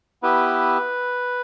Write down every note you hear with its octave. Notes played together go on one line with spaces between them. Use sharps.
B3 E4 G4 B4